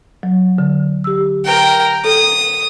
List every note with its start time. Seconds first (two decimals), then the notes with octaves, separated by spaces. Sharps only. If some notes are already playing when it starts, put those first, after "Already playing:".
0.23 F#3
0.58 D3
1.04 G4 E6
1.45 A#4 G5
2.05 A4 D#6